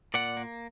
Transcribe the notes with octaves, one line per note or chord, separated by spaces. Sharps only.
A#2 D5 F#5
A#3